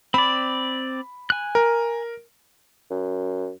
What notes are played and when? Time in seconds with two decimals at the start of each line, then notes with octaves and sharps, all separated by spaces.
0.14 C4 D5 B5
1.30 G#5 F#6
1.55 A#4
2.91 F#2